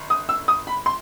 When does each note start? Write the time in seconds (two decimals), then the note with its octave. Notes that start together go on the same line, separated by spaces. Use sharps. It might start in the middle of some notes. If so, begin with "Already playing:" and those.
Already playing: G1
0.10 D#6
0.29 E6
0.48 D#6
0.67 B5
0.86 C6